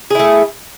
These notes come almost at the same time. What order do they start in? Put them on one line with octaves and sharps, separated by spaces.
G#4 E4 A3